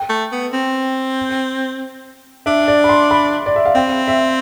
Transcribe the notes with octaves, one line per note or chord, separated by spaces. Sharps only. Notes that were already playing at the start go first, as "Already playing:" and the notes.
Already playing: G5
A3
B3
C4
D4 E5
D5
B5
C6
B5
D5
E5
F5
C4 G5
E5